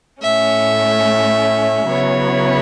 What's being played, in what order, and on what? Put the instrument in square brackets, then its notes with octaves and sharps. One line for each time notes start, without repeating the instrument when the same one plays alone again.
[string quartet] A2 A3 C#4 [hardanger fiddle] E5
[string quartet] C#3 F#3 B3 E4 [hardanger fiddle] C#5